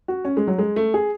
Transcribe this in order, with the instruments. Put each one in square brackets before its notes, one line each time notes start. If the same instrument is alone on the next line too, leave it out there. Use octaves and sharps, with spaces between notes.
[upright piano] F#4
C#4
G#3
F#3
G#3
A3
G#4